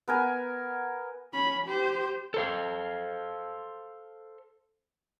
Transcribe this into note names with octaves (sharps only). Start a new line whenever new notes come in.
B3 A#4 G#5
C#4 B5
G4 C5
A4 C5 F5